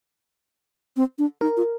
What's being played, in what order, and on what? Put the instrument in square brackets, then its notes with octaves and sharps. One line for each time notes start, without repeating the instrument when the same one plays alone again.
[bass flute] C4
D4
[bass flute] D#4 [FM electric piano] A#4
[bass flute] F4